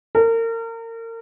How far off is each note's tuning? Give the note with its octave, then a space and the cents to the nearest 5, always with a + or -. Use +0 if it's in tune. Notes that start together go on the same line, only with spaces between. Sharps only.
A#4 -35